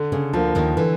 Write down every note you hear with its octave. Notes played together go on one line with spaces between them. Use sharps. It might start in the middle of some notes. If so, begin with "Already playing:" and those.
Already playing: D3
C#3
D2 D3 F3 A#3
D#2 D#3
D3 E3